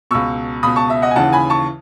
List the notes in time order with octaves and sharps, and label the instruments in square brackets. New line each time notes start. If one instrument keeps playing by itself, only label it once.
[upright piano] C#2 B2 C#6 E6
C#2 B2 B5 D#6
A5 C#6
E5
D#5 F#5
G#5
D#2 C#3 E3 F#5 A5
G#5 B5
A5 C#6